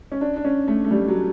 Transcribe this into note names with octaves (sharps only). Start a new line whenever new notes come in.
C#4
D4
D4
C#4
A3
A3
G3
F#3